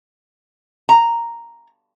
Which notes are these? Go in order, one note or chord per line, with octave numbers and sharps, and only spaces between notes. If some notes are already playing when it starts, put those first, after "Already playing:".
A#5